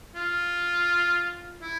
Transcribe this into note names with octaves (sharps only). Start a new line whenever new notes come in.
F4
E4